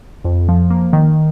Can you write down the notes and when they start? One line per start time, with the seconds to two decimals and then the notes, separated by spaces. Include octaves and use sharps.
0.25 F2
0.49 F3
0.70 A#3
0.93 D#3